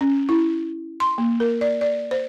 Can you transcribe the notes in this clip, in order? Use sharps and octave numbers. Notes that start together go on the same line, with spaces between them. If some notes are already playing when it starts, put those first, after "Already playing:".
C#4
E4
C6
A#3
A#4
D5
D5
C5